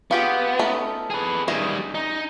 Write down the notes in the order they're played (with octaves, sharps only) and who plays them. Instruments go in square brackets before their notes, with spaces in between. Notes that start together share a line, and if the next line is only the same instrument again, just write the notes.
[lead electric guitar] B3 [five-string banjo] F4 G4 G#4
[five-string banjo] A3 C#4 D#4
[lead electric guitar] G#4 B4
[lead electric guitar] D#3 G3 [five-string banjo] G#4 D#5 E5
[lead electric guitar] D#4